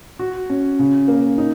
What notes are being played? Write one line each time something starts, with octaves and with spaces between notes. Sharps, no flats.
F#4
C#4
C#3
A#3
D#4